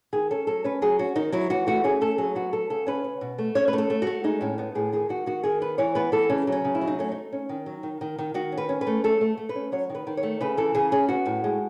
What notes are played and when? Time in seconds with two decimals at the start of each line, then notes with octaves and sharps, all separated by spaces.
0.13 D#3 G#4
0.31 C#4 A4
0.47 F#3 A4
0.64 C#4 B4
0.82 F#3 G#4
0.99 C#4 F#4
1.16 D#3 D#4
1.32 F#3 E4
1.50 E3 F#4
1.67 A3 F#4
1.84 C#4 G#4
2.01 A3 A4
2.18 F#3 G#4
2.35 B3 F#4
2.53 B3 A4
2.70 C#3 A4
2.87 C#4 B4
3.04 C#4
3.21 B2
3.38 A3
3.55 C#4 C#5
3.68 B4
3.73 A3
3.78 A4
3.90 A3
4.02 A3 F#4
4.24 G#3 D#4
4.41 A2 C#4
4.58 B3 D#4
4.75 A2 G#4
4.93 D#3 G#4
5.09 D#3 F#4
5.26 D#3 F#4
5.43 D#3 G#4
5.61 B3 B4
5.78 E3 C#5
5.95 B3 B4
6.12 E3 A4
6.30 C#3 C#4
6.47 F#3
6.52 C#4
6.64 C#3
6.75 E4
6.81 F#3
6.87 D#4
6.99 A3 C#4
7.12 A3 D#4
7.33 C#4
7.49 D#3
7.66 F#3
7.83 D#3
8.01 D#3
8.18 D#3
8.34 D#3 F#4
8.52 C#4
8.57 B4
8.69 C#4
8.81 B4
8.87 A3
9.04 A3 A4
9.21 A3
9.38 A3
9.49 B4
9.55 C#4
9.72 F#3 C#5
9.89 D#3
9.95 B4
10.07 D#3
10.17 C#5
10.23 A3
10.41 C#3 B4
10.57 E3 A4
10.75 C#3 G#4
10.92 C#4 G#4
11.08 B3 F#4
11.26 A2
11.44 G#3